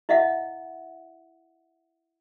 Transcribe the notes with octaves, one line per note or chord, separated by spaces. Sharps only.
E4 D#5 E5 F#5